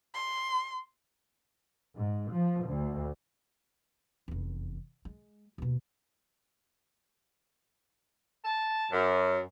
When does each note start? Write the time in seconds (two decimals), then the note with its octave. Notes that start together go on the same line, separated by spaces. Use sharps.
0.14 C6
1.97 G#2
2.32 F3
2.67 D2
4.28 F1 E2
5.05 G#3
5.58 D#2 B2
8.45 A5
8.92 F#2